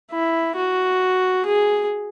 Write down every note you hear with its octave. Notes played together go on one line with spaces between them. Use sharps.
E4
F#4
G#4